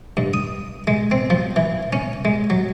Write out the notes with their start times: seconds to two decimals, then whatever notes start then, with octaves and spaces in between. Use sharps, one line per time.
0.17 G2
0.34 D#6
0.87 G#3
1.11 C4
1.30 F3
1.56 E3
1.93 C#4
2.25 G#3
2.50 F#3